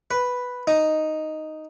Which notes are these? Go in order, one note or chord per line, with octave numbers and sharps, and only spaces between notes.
B4
D#4